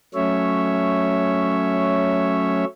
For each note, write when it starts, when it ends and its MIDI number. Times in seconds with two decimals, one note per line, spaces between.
0.15 2.65 54
0.15 2.65 57
0.15 2.65 61
0.15 2.65 73
0.15 2.65 76